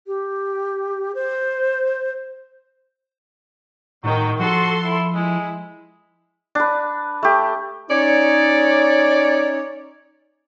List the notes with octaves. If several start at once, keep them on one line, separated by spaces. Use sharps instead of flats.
G4
C5
A2 D#3 F#3 G5
F3 F#4 A4 C6
E4
G#3 E4
D4 B4
A3 G4
C#4 D#4 C#5 D5